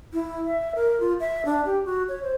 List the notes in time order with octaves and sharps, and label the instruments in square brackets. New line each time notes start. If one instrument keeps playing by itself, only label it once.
[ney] E4
E5
A#4
F4
E5
D4
G4
F#4
C#5
C5